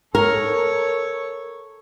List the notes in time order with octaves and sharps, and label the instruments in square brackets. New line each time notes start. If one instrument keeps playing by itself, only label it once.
[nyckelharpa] A4 C#5 [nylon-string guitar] A#4